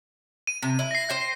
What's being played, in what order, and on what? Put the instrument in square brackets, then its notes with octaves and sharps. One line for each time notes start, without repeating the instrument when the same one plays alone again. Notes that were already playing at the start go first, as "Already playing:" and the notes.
[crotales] D#7
[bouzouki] C3
E4
[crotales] A#6 C7
[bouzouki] C5 G5